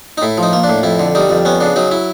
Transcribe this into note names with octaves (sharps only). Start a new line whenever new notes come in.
D#4
A2 E4
F3
D#4
A#3
D4
A2
F2 E4
D3
G3 D#4
F2
B3 C#4
C#3 D4
F#3 D#4
E4